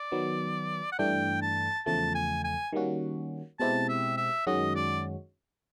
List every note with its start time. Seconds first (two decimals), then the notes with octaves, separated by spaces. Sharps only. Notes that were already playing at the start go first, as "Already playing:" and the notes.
Already playing: D5
0.12 D#3 F#3 B3
0.92 F#5
0.99 G2 E3 A3 D4 G5
1.42 A5
1.86 E2 C#3 F3 A3 A5
2.15 G#5
2.44 G#5
2.73 D#3 G3 A#3 C#4 F#4
3.59 B2 G#3 C4 E4 G4 A5
3.89 E5
4.17 E5
4.47 F#2 D#3 G#3 C#4 F#4 D#5
4.76 D5